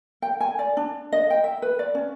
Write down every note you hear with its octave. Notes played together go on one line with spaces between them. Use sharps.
G5
G#5
D5
D4
D#5
G5
E5
B4
D5
C#4